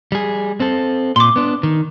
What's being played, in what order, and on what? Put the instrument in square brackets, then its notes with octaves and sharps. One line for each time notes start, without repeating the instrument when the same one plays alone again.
[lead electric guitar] G3 G#4
C4 A4
[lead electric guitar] A#2 [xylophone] C6 D6
[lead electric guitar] B3 D4
D#3